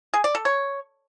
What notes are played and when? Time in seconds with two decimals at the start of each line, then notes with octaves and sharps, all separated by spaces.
0.14 G#4
0.24 D5
0.35 A4
0.45 C#5